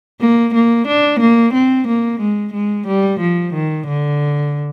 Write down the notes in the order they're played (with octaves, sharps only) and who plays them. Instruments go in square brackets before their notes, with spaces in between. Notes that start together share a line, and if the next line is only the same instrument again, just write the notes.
[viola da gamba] A#3
A#3
D4
A#3
C4
A#3
G#3
G#3
G3
F3
D#3
D3